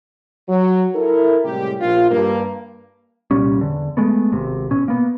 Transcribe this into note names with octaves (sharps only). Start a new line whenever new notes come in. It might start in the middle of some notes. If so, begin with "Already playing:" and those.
F#3
E4 A4 A#4
A2 C3 G3 G#3 G4
A#1 F4
G2 A#3
C2 A#2 G3 C#4
E2 D3
G#3 A3 B3
G#1 C3
B2 C#4
A#3 B3